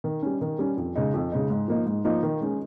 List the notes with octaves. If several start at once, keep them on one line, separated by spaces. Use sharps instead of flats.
D#3
G3 C#4
D#3
G3 C#4
F2
C#3 G#3 D#4
F2
C#3 G#3 D#4
G#2
F3 A#3 D#4
G#2
F3 A#3 D#4
D#3
G#3 C#4